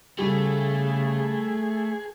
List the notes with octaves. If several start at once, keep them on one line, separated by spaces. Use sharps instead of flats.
C#3 G3 A3 G#4